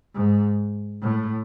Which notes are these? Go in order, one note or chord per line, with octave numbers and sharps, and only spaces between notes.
G#2
A2